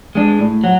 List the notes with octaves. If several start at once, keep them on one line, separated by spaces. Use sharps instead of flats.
G#3 D4
A2
F#3